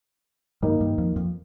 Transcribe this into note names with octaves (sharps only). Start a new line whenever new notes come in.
G2 D#3 G3 A#3 D#4 A#4
G2 G3
F2 F3
F2 F3